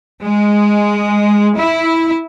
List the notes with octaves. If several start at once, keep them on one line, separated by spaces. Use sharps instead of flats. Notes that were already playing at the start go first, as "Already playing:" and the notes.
G#3
E4